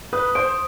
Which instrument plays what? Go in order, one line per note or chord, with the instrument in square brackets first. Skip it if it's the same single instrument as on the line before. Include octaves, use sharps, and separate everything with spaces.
[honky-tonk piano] B4 [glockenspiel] D#6
[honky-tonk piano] C5 [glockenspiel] D7